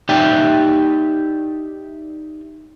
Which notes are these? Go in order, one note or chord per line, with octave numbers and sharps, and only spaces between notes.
D#4 G4 D5 E5 G5